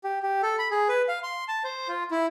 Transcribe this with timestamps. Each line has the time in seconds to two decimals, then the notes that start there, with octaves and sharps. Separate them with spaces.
0.04 G4
0.23 G4
0.43 A4
0.59 B5
0.71 G#4
0.89 B4
1.08 F5
1.23 C6
1.48 A5
1.64 C5
1.88 F4
2.11 E4